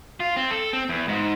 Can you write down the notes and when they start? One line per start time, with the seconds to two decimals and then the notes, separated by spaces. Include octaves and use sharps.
0.20 F4
0.36 C4
0.51 A4
0.73 C4
0.89 E2
1.08 G#2